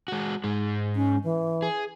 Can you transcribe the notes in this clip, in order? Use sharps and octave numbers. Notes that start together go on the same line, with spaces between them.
G#3 F#4
G#2 G#3
C#4
E3
G#4